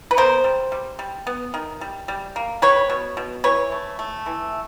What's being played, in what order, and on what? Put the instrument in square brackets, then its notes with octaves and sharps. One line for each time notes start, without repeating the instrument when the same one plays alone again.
[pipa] B4
B3 A#4 C5
G3
G3
G3
B3
D#3
G3
G3
A#3
G3 B4 C#5
B2
B2
E3 B4 C#5
A3
A3
E3